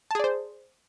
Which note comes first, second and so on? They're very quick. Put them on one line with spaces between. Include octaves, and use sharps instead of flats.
A5 G#4 D5 C5